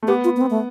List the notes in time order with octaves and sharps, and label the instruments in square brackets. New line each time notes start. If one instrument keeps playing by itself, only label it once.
[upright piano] A3
[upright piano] B3 [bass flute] G4
[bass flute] F4
B3
C4
A3